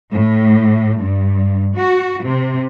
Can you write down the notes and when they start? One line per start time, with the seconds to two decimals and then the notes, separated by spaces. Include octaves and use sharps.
0.13 A2
1.01 G2
1.77 F#4
2.25 C3